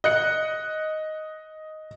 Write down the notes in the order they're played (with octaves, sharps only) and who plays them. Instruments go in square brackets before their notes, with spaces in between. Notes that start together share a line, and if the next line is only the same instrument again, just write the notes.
[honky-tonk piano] D#5 F#6 C#7